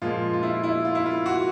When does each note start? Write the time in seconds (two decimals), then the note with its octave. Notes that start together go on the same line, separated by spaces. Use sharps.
0.02 A#2 F3 G#3 F4
0.33 F4
0.43 E4
0.63 E4
0.85 F4
0.95 E4
1.06 F4
1.26 F#4